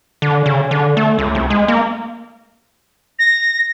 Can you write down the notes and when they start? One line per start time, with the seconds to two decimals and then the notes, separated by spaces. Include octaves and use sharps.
0.22 D3
0.46 C#3
0.71 D3
0.97 A3
1.19 C#2
1.35 C2
1.50 G#3
1.68 A#3
3.19 A#6